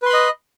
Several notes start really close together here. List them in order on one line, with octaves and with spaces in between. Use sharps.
B4 C6 B5 D#5